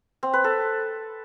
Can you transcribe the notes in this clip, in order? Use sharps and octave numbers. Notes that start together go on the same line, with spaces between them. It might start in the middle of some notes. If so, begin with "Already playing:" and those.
C4
B4
A4